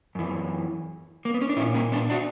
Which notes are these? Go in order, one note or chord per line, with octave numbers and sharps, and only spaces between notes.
F#2 E3
A#3
B3
C#4
D4
A#2 C#4 E4
A#3 C#4
B3 D4
D4 F#4